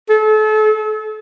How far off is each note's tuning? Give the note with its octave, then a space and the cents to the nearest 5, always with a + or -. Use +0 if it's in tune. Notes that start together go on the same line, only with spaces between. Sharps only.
A4 -35